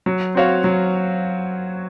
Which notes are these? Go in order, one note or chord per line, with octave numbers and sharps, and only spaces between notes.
F#3
C4 F#4 C#5 F5
F#3